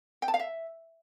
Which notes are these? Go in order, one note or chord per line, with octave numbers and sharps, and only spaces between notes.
G5
A5
F5
E5